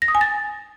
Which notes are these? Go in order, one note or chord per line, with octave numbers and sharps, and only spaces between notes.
A#6
D#6
G#5
A6